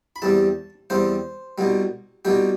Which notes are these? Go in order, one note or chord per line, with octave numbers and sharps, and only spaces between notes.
B5
E2 C3 G3 A5
E2 C3 G3 C5
C2 B2 G3
C2 B2 G3 G4